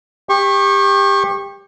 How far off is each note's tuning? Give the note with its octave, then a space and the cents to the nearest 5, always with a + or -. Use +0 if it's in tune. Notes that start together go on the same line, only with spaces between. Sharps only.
G4 +20 C#6 -25